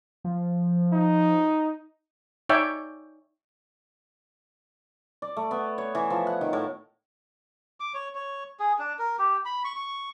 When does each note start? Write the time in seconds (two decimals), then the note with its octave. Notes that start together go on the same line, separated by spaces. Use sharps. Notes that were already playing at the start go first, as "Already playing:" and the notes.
0.24 F3
0.93 D#4
2.49 D#4 C#5 D5 E5 G5
5.22 D5
5.36 A3
5.51 B3
5.78 C#5
5.95 E3
6.10 F3
6.27 F#5
6.41 D#3
6.53 A2
7.80 D6
7.94 C#5
8.15 C#5
8.60 G#4
8.79 D4
8.99 A#4
9.19 G4
9.45 B5
9.65 C#6
9.76 C#6